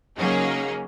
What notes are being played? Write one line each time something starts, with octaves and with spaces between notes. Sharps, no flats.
C#3 F#3 A#3 C#4 D#4 G#4